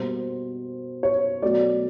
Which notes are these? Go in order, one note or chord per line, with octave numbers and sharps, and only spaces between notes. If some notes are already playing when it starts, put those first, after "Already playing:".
Already playing: B2 G3 A#3 C5
C#5
B2 F#3 A3 D5